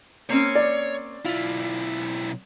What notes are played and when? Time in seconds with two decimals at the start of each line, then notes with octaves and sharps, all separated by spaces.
0.30 A#3 C4 C#4 C#5
0.55 D5
1.25 B1 E4 F4